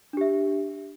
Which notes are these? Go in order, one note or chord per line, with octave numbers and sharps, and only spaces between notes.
D4 G4 E5